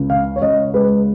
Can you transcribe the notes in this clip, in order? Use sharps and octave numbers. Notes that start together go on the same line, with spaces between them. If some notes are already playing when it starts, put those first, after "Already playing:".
Already playing: C#2
C#3 F5
C#5
C#2 D#5
G#3 B4